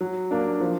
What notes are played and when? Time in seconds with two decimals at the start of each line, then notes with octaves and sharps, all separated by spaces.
0.01 F#3
0.31 A#3 D4
0.61 F3